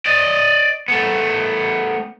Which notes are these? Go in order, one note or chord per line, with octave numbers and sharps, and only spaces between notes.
D5 D#5
A3 B3